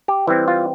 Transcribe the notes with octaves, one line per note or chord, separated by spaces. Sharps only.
G4
E3 G3 C4 E4
F4